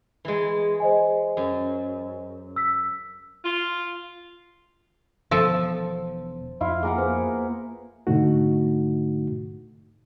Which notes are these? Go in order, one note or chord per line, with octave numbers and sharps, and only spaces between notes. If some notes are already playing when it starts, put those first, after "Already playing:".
E3 G#3
C5 D#5 G#5
F#2
E6 B6
F4
E1 D#3 F3 B3 A4 C5
F2 E4 F4 F5
A#3 G#4 A#4 F#5
B3 G#4 C5
G#2 B2 D3 A3 D#4 F#4